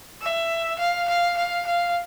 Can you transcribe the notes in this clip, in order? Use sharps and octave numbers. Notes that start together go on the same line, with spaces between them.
E5
F5
F5
F5
F5